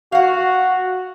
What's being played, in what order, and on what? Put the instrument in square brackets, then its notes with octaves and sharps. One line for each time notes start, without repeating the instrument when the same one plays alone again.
[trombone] F#4 [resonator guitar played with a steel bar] F5 F#5